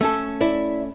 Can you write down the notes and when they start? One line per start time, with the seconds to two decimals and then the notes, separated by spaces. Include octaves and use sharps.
0.01 A3 C#4 A4
0.41 E4 D5 E5